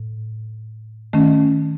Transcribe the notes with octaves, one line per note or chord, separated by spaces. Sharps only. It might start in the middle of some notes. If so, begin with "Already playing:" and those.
Already playing: A2
D#3 A3 C#4